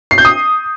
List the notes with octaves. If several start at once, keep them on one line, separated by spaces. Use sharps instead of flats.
C7
G6
D#6